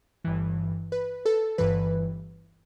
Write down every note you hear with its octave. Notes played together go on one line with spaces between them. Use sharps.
G1 G2 E3
B4
A4
G1 G2 E3 B4